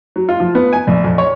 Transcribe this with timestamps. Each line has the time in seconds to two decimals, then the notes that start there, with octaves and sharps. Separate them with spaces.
0.16 F#3
0.29 F4
0.40 F3
0.55 B3
0.72 G#5
0.87 A#1
1.04 F2
1.18 C#5